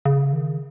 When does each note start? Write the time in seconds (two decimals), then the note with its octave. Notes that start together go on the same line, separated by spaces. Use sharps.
0.06 C#3
0.33 D#3